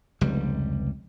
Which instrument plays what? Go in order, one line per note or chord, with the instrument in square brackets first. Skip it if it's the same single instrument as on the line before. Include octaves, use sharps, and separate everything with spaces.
[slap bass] F1 C#2 G3